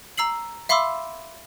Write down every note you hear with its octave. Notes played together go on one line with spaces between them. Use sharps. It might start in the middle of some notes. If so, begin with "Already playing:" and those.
A#5 E6 C7 F#7
E5 F5 B5 C6 D6 E6